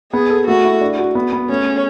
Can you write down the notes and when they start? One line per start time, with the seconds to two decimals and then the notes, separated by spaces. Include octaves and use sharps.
0.13 B3 G#4
0.30 A4
0.47 A3 F#4
0.65 E4
0.81 D4
0.99 F#4
1.15 B3
1.33 B3
1.49 A3 C#4
1.67 G#4